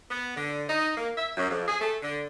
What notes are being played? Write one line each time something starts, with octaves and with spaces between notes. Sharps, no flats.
B3
D3
D#4
A#3
E5
F#2
F2
G#4
A3
D3